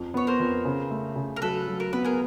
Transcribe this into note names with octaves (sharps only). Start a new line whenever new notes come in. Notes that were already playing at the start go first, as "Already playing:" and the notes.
Already playing: F2
B3 C#5
A#4 C5
F2
C#3
A3
C#3
A#4
F#3 A4 B4
F#3
A#4
B3 B4
G#4 A#4